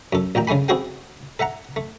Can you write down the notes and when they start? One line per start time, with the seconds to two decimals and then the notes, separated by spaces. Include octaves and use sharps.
0.13 F#2 A4
0.35 A1 A#2 G5 A#5
0.47 C#3 G#3 A3 G#5 B5
0.68 C4 E4 F#4 G#4 A4 G5
1.39 A4 E5 F#5 A#5
1.76 A3